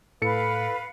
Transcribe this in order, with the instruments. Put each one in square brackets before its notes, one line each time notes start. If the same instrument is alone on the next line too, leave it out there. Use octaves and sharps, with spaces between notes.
[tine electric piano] A2 [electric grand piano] A4 C#7 [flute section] B4 F5